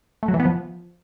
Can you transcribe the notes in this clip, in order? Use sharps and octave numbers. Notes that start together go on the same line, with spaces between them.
A3
F#3
E3
B3
F3